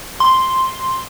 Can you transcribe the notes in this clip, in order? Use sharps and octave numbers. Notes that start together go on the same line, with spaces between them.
C6